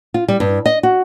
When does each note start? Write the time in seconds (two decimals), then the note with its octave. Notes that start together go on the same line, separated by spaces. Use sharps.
0.14 F4
0.28 G3
0.40 G2
0.66 D#5
0.83 F#4